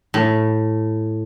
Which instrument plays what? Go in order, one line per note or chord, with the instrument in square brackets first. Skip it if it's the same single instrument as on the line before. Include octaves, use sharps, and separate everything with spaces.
[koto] A2